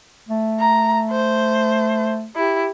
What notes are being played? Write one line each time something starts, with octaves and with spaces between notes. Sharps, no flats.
A3
A#5
C5
E4 G4